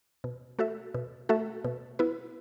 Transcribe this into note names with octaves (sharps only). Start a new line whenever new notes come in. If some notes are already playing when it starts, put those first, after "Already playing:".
B2
A3 F#4 A4 E5
B2
A3 F#4 A4 E5
B2
B3 E4 B4